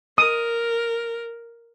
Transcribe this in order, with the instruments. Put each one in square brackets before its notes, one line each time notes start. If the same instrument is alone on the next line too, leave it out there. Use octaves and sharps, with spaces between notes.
[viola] A#4 [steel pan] D#6